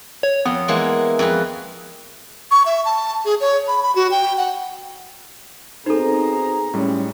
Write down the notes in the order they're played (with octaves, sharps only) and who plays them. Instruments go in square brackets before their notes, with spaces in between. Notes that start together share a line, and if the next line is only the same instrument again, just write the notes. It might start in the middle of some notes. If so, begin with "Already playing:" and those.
[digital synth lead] C#5
[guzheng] F2 [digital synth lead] B3
[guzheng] E3 G#3 A#3
F2 G#4 B4
[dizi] C#6
E5
A5
G#4
C#5
B5
B5
F#4
G5
F#5
[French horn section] B2 C4 [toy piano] D#4 A4 [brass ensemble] G#4 A#5 [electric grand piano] C5
[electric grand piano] A2 G3 G#3 [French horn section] C#4